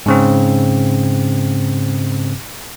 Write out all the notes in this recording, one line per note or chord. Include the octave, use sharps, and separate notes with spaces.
G#2 C#3 C4